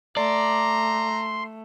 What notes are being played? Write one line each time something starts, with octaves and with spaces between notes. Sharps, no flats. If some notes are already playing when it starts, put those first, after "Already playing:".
A3 D5 A#5 C6